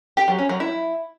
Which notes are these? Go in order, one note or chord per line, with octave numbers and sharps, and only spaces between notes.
G4
F#3
C#4
F#3
E4